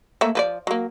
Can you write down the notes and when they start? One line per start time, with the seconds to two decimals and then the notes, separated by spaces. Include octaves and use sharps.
0.21 A3 A#3 E5
0.35 F3 B4 D5
0.67 F#3 A#3